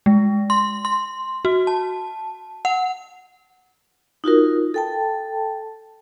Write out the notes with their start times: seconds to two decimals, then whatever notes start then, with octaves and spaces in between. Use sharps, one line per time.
0.06 G#3
0.50 C6
0.85 C6
1.45 F#4
1.67 A5
2.65 F#5
4.24 D#4 F4 F#4 A#4
4.74 A4 G5 A5